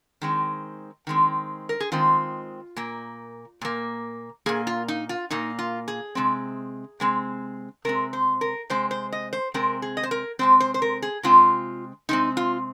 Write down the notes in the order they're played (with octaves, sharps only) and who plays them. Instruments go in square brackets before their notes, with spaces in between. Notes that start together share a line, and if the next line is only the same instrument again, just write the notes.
[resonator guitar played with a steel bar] D#3 G#3 C4
D#3 G#3 C4
A#4
G#4
D#3 G#3 C4 F4
A#2 A#3
A#2 A#3
A#2 A#3 G#4
F4
D#4
F4
A#2 A#3 D#4
F4
G#4
C3 G#3 C4
C3 G#3 C4
C3 G#3 C4 A#4
C5
A#4
C3 G#3 C4 C5
C5
D#5
C5
C3 G#3 C4 A#4
G#4
D#5
C5
A#4
C3 G#3 C4 C5
C5
C5
A#4
G#4
C3 G#3 C4 F4
C3 G#3 C4 D#4
F4